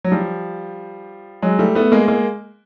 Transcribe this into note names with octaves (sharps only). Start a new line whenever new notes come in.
F#3
F3 G3
F#3 G#3
G3 A3
A3 B3
G#3 A#3
G#3 A#3